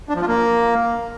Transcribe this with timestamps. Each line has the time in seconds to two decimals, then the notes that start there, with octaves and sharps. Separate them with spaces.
0.09 D4
0.15 F3
0.21 F4
0.28 A#3